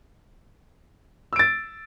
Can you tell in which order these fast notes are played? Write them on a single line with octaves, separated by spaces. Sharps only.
E6 D7 A6